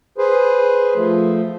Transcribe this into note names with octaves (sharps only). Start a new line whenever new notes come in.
G#4 B4 C5
F3 A3